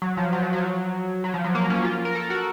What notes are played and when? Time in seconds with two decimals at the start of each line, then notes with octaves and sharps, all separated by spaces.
0.02 F#3
0.17 F3
0.33 F#3
0.42 F3
0.53 F#3
1.24 F#3
1.34 F3
1.44 F#3
1.55 A#3
1.70 C#4
1.85 F4
2.05 A#4
2.15 A4
2.30 F#4